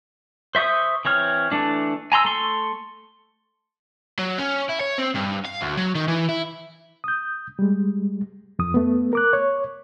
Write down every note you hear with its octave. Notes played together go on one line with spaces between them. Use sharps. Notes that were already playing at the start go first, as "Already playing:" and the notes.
C5 E5 C#6 D#6 G6
E3 C4 C#5 F6
E3 A3 D4
G#5 A#5 C6 E6
A3 C6 C#6
F#3
C#4
E4
C#5
C4
G2
F5
D2
F#3
D#3
E3
E4
D#6 G6
G3 G#3
F2 D#6
A3 B3
A#4 D6 F#6
C#5